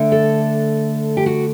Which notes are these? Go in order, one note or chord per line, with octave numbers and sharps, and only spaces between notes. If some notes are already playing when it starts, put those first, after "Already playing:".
Already playing: D3 A3 D4
A4
G4
F#4